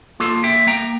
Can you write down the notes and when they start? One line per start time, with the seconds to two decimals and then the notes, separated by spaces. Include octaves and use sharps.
0.20 A#3 F4 A4
0.44 E5 G5
0.67 A#3 G5 A#5